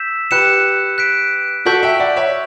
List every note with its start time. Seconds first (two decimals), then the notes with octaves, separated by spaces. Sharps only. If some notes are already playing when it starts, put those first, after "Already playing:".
Already playing: E6 G6 B6 E7
0.31 G4 B4 F#6 C#7 E7
0.98 F#6 B6 D7
1.65 F#4 A4 C#6 G6 B6 D7 F#7
1.83 E5 G5
2.00 D5 F#5
2.16 C#5 E5